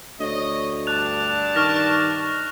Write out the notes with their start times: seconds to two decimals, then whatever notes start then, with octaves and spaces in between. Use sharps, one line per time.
0.20 D2 C#5 D#5
0.87 G2 D4 A5 F#6 F7
1.56 D#3 C#6 F6 A#6